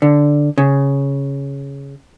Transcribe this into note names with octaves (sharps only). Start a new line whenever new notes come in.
D3
C#3